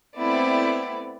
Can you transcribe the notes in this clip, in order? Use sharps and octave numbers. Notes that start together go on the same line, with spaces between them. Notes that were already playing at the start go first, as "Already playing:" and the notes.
A3 B3 C4 E4 D5